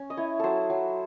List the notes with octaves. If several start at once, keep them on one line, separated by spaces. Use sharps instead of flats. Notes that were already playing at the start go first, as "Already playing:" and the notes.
Already playing: C#4
D#5
E4 C#5
F#3 A4 C5
F#3